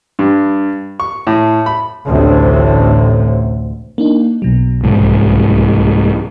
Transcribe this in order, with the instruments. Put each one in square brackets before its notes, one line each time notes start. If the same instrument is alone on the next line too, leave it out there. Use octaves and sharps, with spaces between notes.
[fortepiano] G2
C#6
A2
B5
[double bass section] A1 D2 A2 C3
[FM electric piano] A#3 D4 D#4
B1 B2 F#3
[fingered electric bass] C2 G#2